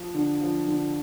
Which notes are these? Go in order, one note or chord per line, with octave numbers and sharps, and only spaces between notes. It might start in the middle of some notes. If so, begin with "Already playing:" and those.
Already playing: F3
D3
F3
D3